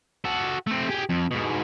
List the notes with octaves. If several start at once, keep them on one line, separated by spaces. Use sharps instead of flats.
F#4 A4
A3 C4
G4 G#4
F2
G#2 B2